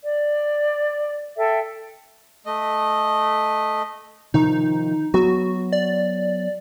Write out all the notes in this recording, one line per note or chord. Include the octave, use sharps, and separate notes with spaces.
D5
A4 E5 G5
A3 D#5
C3 D#3 F3 D#4
F#3 B3 F#4
D5